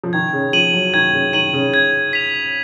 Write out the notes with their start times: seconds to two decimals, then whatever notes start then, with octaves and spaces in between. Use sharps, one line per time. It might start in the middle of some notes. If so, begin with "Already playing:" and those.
0.03 F3
0.13 D#3 G#6
0.33 C#3
0.53 F3 D#7 F#7
0.73 F#3
0.94 D#3 G#6
1.13 C#3
1.33 D#3 D#7 F#7
1.53 C#3
1.74 G#6
2.13 B6 F7